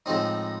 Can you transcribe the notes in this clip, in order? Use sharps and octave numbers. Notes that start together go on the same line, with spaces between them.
A2 F3 G#3 C4 D#4